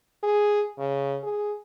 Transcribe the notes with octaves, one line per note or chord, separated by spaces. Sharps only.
G#4
C#3
G#4